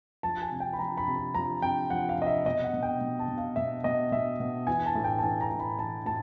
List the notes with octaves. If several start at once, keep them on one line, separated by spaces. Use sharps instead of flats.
F3 A5
G#5
C3
G5
B5
F3 A#5
B5
C3
B5
F3 A#5
C3 G5
F3 F#5
F5
C3 D#5
E5
B2 D#5
F#5
B2
G5
B2
A5
B2
F5
B2 E5
B2 D#5
B2 E5
B2
E3 G#5
A5
A2
G5
A5
E3 G#5
A#5
A2
B5
E3 A5
A2 A5